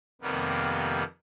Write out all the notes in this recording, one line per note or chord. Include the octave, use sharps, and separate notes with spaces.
F2 C3 D#3 G3 A#3 B3